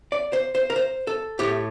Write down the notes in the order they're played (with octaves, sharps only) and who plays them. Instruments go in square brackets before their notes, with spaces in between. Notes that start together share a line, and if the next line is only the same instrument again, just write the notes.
[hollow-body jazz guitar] D5
C5
C5
A#4
C5
A4
A2 A3 G4